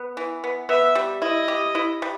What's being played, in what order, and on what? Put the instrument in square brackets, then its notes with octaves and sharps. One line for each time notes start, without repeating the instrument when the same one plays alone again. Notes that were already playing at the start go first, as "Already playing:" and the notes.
Already playing: [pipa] B3
E3
B3
[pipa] B3 [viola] E5
[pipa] G3
[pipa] E4 [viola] D#5
[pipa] G4
E4
G3